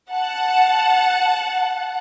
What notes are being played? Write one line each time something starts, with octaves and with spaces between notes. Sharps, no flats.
F#5 A5